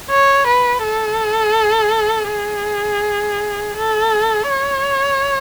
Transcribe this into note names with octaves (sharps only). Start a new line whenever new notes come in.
C#5
B4
A4
G#4
A4
C#5